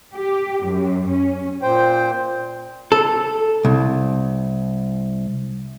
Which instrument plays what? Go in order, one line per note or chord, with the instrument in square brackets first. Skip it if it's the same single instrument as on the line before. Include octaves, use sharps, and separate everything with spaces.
[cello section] G4
F#2
C#4
[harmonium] A#2 C5 G5
[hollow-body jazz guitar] A4
C2